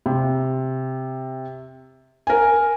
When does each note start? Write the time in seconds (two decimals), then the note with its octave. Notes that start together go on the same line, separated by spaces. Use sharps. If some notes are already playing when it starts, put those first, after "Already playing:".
0.06 C3
2.27 A#4 G#5